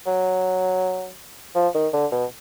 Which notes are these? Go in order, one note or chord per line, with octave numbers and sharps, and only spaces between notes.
F#3
F3
D#3
D3
B2